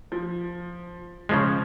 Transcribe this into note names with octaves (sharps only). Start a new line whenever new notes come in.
F3
C#3 F3 G#3